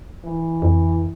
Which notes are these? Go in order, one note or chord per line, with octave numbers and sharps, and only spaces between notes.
E3
F2